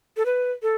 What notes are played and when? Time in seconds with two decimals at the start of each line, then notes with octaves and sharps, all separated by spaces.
0.17 A4
0.26 B4
0.63 A4